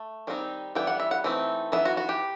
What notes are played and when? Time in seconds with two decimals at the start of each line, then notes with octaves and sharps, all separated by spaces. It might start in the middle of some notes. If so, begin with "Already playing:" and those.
Already playing: A3
0.27 D#3 G3 C4 D#4
0.75 E3 G3 B3 G5
0.87 F#5
1.00 E5
1.11 F#5
1.24 E3 A3 C4 D#4
1.72 E3 B3 D#4 E5
1.85 F#4
1.97 F#4
2.09 G4